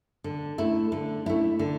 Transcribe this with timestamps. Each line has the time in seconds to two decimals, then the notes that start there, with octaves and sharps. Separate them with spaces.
0.24 D3
0.58 A3 E4
0.92 D3
1.26 A3 E4
1.59 D3